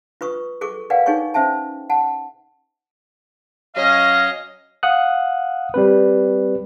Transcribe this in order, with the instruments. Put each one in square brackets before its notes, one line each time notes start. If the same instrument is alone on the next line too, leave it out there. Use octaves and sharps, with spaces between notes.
[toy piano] F4 B4 C#6 D#6
G#4 A4 C#6 D6
A#4 B4 D5 F5 F#5 G#5
D#4 G#4 C#5 G#5 C#6
C#4 C5 E5 G5 A5
F#5 A5
[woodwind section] F#3 C#4 F5 [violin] D#5 A#6
[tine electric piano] F5 F#5 D#6 F#6
G3 C4 B4